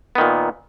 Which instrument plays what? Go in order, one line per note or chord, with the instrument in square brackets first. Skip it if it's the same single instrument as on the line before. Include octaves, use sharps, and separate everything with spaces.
[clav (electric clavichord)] B3
D#3
A#2